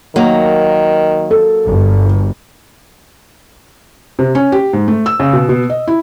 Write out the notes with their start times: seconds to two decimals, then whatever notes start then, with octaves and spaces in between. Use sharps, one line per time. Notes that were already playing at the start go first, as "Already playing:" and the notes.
0.16 D#3 F#3 A#3
1.31 A4
1.65 G1
4.19 C3
4.35 C#4
4.52 G4
4.73 G#2
4.88 A3
5.06 E6
5.20 C#3
5.33 B2
5.49 B2
5.70 D#5
5.88 E4